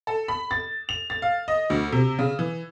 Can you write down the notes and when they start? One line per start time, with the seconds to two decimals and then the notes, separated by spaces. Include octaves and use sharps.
0.07 A4
0.28 B5
0.51 A6
0.89 F7
1.10 A6
1.22 F5
1.48 D#5
1.70 D2
1.92 C3
2.19 C#3
2.39 E3